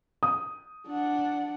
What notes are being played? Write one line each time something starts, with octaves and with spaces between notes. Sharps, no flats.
D#6
D4 F#5